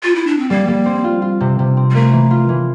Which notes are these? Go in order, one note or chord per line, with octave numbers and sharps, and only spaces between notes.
F4
E4
D4
C4
G3 A#3
G3
C4
F4
F4
C3
C3
C4
G3
A3 A#3
E3
F4
E3